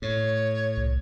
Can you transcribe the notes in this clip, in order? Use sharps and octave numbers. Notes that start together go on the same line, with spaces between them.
A2 C#5
C2